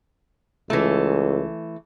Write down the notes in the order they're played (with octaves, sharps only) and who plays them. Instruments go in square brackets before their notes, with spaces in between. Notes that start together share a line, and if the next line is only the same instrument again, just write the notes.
[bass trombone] C#2 [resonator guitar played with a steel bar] E3 A3